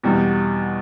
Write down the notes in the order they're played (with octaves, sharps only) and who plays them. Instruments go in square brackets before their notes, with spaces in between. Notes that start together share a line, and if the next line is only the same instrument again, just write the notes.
[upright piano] E2 B2 G3